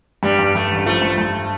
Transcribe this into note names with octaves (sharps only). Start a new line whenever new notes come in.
G2 G3
G2
G2 A3
A1
F3 A3
G2
G2